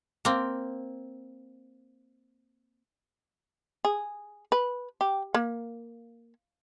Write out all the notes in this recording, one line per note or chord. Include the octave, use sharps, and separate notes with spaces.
A#3 C4
G#4
B4
G4
A#3